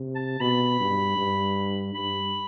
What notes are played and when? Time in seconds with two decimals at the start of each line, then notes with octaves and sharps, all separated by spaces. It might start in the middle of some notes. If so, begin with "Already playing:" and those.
Already playing: C3
0.15 A5
0.40 B2 B5
0.80 G2
1.17 G2
1.95 G2 B5